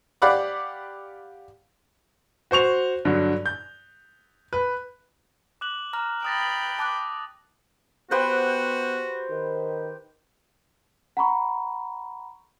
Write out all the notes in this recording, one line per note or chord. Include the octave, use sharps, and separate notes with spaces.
G4 D5 F5 F#5 B5 D6
F#4 C5 C#6 F7
G2 D3 F#3
G6
B4
D6 F#6 F#7
A#5 F6
G5 B5 D#6 A6 A#6
A5 D6 F#6
B3 F#4 G4 B4 C5
D#3
F#5 A#5 B5 C#6